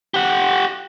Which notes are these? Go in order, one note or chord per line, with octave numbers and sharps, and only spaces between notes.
G4 F#5